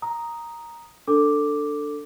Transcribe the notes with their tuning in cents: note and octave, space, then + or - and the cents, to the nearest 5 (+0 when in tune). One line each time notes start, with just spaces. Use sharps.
A#5 +0 D#6 +0
D4 +0 A4 +15 D6 +0